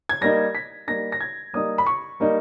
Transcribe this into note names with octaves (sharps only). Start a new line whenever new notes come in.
G#6
G3 A#3 D#4 A#6
B6
G3 A#3 D#4 A#6
A#6
G#6
G3 A#3 D#4 D#6
B5
C#6
G3 A#3 D#4